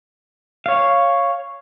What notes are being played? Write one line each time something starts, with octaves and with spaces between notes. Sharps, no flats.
C#5 F5